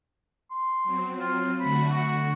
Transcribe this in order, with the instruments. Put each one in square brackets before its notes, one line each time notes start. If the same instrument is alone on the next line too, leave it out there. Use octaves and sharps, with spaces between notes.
[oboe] C6
[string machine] F#3 C4
[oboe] F4
[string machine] D3 A3 F#4 [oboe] B5
[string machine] D3 [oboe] F#4